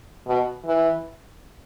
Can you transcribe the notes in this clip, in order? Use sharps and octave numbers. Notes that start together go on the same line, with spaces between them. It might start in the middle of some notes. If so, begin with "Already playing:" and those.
B2
E3